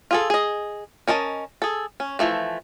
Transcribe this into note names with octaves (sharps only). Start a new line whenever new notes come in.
F4 G#4 A4
G#4 D#5
C#4 A#4 D#5 A5
G#4 A4
C#4
E3 F3 A3